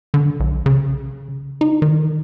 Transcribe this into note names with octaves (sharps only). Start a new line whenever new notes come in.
D3
B1
C#3
D#4
D#3